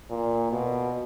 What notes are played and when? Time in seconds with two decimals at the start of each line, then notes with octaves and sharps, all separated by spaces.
0.10 A#2
0.52 B2